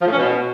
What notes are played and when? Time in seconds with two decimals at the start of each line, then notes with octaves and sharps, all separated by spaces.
0.01 F3
0.07 A2
0.12 C#4
0.18 B2